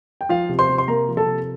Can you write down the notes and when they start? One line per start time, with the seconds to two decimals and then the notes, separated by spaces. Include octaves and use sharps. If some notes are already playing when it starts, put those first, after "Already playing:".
0.21 G5
0.29 F3 F4 F5
0.49 C3
0.59 C5 C6
0.69 C3
0.78 C6
0.88 A#3 A#4 A#5
1.08 F3
1.17 A4 A5
1.26 C3